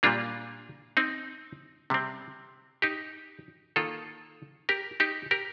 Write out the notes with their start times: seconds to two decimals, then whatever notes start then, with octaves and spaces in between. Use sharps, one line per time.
0.03 A#2 G3 A#3 D4 F4
0.97 C4 D#4
1.90 C3 G3 C4
2.82 D#4 G4
3.76 D#3 A#3 F4 A4
4.69 G4 A#4
5.00 D#4 G4
5.31 G4 A#4